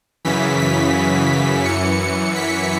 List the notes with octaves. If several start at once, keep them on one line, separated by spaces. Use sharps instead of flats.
F#2 C#3 E3 B6
B6
F#2 E3 C#7
C#7
B6